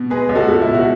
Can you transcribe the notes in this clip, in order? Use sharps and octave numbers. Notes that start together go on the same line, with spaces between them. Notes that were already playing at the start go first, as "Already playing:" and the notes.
Already playing: B2
G#3 G#4 B4
C#2
F#4 A4
C#2
E4
B2
F#4